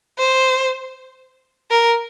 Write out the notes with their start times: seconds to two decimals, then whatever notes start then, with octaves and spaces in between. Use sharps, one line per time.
0.18 C5
1.71 A#4